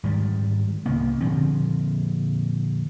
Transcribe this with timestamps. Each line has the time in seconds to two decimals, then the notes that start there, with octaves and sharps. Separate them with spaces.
0.04 G#2 D#3 G3
0.86 C2 C#3 A#3 B3
1.21 A#2 D3 F3 C4